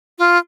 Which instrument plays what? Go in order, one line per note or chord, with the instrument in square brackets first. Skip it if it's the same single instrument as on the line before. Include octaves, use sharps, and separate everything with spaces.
[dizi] F4